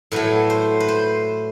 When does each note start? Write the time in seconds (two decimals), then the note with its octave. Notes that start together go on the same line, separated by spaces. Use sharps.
0.12 A2 F#3 A3 B4
0.50 C5
0.80 B4
0.89 C5